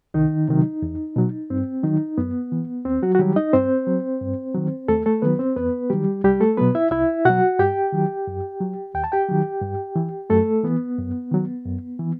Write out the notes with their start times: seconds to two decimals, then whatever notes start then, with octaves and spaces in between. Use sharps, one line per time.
0.14 C2 D#3 D#4
0.48 C3 D#3 F#3
0.82 E2
1.16 B2 F#3
1.50 G2 C4
1.83 D#3 F#3 D#4
2.18 F#2 B3
2.52 E3
2.85 D#2 C4
3.03 F#3 F#4
3.15 F#4
3.19 D#3 F#3 G3 G4
3.36 D#4 D#5
3.53 G2 C4 C5
3.87 F#3
4.21 G2
4.54 D#3 F#3
4.88 D#2 A3 A4
5.06 A3 A4
5.22 D#3 F#3 B3 B4
5.39 C4 C5
5.56 E2 B3 B4
5.90 D#3 F#3 G3 G4
6.24 C2 G3 G4
6.40 A3 A4
6.57 B2 F#3 B3 B4
6.75 E4 E5
6.91 C2 E4 E5
7.25 B2 F#3 F#4 F#5
7.59 G2 G4 G5
7.93 D#3 F#3
8.27 F#2
8.61 F#3
8.94 D#2 G5
9.04 A5
9.12 G4 G5
9.29 D#3 F#3
9.62 G2
9.96 E3
10.30 F#2 A3 A4
10.64 E3 B3
10.98 F#2
11.31 D#3 F#3
11.65 F#2
11.99 E3